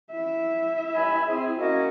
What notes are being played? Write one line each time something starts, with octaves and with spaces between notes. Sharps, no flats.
E4 E5
G2 G#5 B5
C4 G#4
A#3 C#4 F#4 D#5